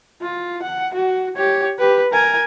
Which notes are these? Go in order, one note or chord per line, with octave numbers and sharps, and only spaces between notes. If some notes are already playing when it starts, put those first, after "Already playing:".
F4
F#5
F#4
G4 C#5
G4 B4
A#4 G#5